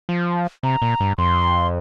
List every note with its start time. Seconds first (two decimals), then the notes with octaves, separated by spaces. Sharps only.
0.09 F3
0.63 C3 A#5
0.82 A#2
1.00 G2
1.18 F2 C6